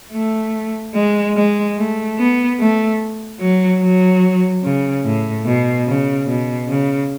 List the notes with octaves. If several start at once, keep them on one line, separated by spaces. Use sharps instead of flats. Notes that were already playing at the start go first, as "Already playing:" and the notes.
A3
G#3
G#3
A3
B3
A3
F#3
F#3
C#3
A2
B2
C#3
B2
C#3